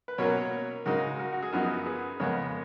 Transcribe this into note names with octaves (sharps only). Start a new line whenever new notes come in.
B4
B2 F#3 A#3 C#4 A#4 C#5
C#3 G#3 D#4 F#4 A#4
F#4 A#4
F#4
G#4
F#2 F3 B3 D#4 F#4 A#4
G#4 B4
F2 C#3 G#3 B3 A#4 C#5